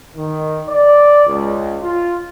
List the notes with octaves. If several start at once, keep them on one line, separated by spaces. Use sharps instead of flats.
D#3
D5
C#2
F4